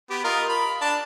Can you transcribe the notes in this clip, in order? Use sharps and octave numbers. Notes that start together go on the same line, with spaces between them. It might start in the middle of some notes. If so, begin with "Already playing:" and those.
B3 G4
F4 A#4 D#5
B5
D4 A5